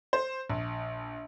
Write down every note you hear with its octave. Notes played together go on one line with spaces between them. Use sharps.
C5
A#1